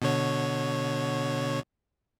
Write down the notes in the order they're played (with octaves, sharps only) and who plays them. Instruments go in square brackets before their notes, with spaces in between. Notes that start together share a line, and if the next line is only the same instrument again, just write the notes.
[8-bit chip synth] B2 D3 C#5